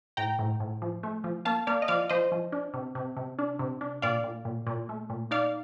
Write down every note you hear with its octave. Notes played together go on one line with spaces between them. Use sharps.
A2 G5 A#5
A2
A2
F3
A3
F3
A#3 F5 A5
A#3 D5 F5
D#5
F3 D5 F5
F3 C5 D#5
F3
D4
C3
C3
C3
D4
C3
D4
A#2 D5 F5
A#2
A#2
A#2
A3
A#2
D#4 D5 F5